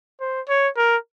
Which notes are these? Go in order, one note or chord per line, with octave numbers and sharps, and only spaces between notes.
C5
C#5
A#4